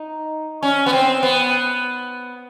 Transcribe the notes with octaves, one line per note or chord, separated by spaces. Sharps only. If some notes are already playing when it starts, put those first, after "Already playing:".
Already playing: D#4
C#4
B3
C4
B3